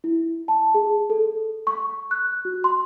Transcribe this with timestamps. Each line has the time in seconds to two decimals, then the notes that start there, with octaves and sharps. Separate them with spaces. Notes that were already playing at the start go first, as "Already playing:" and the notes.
0.04 E4
0.48 A5
0.74 G#4
1.10 A4
1.67 C#6
2.11 F#6
2.45 F#4
2.64 C6